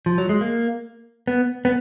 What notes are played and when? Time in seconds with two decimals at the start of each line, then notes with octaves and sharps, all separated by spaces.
0.06 F3
0.18 F#3
0.29 G#3
0.41 A#3
1.28 B3
1.65 B3